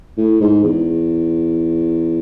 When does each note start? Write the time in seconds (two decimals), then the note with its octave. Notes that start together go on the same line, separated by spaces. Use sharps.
0.17 A2
0.41 G#2
0.64 E2